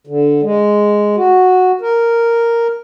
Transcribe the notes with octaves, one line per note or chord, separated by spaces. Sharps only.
D3
G#3
F#4
A#4